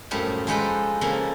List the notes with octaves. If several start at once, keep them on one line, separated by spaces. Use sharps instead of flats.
F#2 A2 F3 G3 A5
F3 G#3 D#4 A4 B4 G5
C#3 F3 A#3 A4